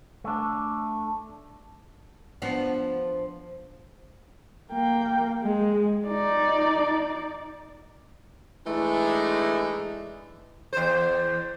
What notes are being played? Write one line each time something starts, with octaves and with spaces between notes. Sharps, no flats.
A3 D4
F3 B3 D4
A#3 G5
G#3
D#4 D5
E3 G#3 A3 D4 D#4
E2 C5